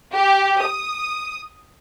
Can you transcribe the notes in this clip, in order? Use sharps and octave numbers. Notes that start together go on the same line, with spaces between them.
G4
D#6